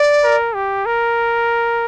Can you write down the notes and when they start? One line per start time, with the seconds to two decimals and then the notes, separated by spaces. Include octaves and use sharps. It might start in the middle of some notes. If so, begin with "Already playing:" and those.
Already playing: D5
0.24 A#4
0.55 G4
0.86 A#4